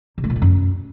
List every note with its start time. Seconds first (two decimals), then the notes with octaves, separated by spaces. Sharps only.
0.18 C3
0.24 A3
0.30 A#2
0.36 D3
0.42 F#2